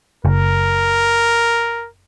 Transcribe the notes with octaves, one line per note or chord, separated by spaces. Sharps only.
F#1 A#4